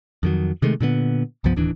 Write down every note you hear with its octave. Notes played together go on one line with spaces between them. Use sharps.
F2 D#3 F#3
C3 D#3 G#3 A3
A#2 D3 G3 B3
C2 G2 F3 B3
D1 D#2 E3 D4